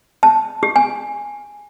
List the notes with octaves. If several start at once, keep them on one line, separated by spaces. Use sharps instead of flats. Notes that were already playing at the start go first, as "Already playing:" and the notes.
A5
G4
G#5